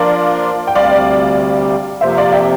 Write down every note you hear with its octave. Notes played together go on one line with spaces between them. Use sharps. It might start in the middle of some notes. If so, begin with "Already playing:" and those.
Already playing: F3 A#3 D4 F4 A#4 D5 F5
G5
D2 C3 G3 D5 F5
F2 C3 F3 A#3 C5 E5
D5 F5
E5 G5